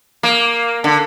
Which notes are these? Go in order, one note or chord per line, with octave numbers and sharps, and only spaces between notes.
A#3
D3